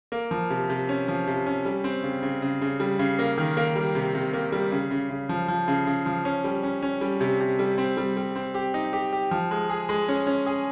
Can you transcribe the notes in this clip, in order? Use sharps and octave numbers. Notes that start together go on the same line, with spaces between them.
A#3
F3
C3
C3
C#4
F3
C3
C#4
G3
C4
C#3
C#3
C#3
C#3
G3
C#3
A#3
D#3
A#3
G3
C3
C3
A#3
G3
C#3
C#3
C#3
F3
F3
C#3
C#3
F3
C#4
G3
C#4
C#4
G3
C3
C3
G3
C4
G3
G3
C4
G4
D#4
G4
G4
F3
G#3
G#4
G#3
C#4
C#4
G#4